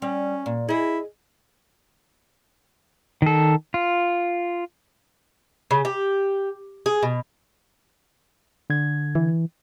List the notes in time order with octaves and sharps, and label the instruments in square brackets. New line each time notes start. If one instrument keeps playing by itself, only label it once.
[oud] G3 [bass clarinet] C#4
[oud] A#2
[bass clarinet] E4 [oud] G#4 D#5
[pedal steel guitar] D#3 A4
F4
[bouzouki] C#3
G4
G#4
B2
[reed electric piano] D3 G#6
[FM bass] E3